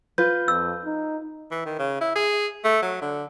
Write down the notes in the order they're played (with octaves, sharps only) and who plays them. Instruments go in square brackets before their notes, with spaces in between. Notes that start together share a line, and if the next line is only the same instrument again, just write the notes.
[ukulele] F4 B4 [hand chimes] G6
[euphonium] F2 [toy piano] E6
[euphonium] D#4
[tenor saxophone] E3
D#3
C#3
E4
G#4
A3
F#3
D3